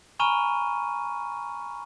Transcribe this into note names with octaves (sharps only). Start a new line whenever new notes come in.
G#5 A#5 B5 C#6 F6 D#7